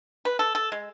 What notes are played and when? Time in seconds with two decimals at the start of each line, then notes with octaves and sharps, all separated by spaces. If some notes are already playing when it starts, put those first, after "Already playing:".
0.25 B4
0.39 A4
0.55 A4
0.72 G#3